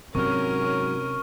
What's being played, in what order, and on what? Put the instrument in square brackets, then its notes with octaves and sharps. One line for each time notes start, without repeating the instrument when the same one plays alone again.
[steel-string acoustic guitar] G#2 F#3 [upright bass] C3 [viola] C#4 A#4 [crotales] C#6 F6